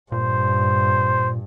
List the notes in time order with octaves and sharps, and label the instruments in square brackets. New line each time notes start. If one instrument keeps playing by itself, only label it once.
[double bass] G2 [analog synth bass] A#2 [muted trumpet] C5